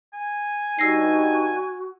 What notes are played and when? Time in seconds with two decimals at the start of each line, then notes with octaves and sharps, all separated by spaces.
0.13 G#5
0.79 G2 D#4 F#4 E6 A#6 C7